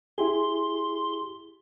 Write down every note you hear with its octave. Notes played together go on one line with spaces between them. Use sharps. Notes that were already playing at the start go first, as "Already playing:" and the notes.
E4 G4 G#4 C6